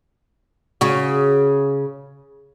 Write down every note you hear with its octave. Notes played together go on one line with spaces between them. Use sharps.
C#3 F#4